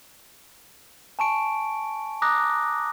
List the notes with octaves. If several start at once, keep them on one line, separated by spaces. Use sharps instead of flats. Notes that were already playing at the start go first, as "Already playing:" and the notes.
G#5 A5 C#6 D7
A#5 D6 D#6 F#6 A#6